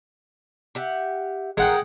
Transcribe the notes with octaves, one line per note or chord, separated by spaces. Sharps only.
G4 E5 F#5
D#3 G#3 A3 A#4 F#5 G5